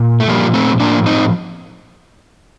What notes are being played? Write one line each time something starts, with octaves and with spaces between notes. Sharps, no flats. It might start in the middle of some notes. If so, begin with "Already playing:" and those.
Already playing: A#2
A3
A#2 F3 G3 A#3
A3 C4
A2 F3 A#3 D4
C4 D#4